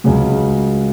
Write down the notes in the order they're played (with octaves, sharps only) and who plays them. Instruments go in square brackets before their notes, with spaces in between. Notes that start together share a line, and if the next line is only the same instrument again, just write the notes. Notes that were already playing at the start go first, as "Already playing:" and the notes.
[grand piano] C#2 C#3 F#3